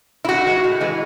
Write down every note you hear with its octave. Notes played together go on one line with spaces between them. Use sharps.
E4
A2 F#4
E3 G#3
A2
E3 G#3